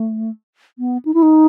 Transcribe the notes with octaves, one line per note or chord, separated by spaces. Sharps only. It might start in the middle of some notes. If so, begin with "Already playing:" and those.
Already playing: A3
B3
D#4
E4
D#4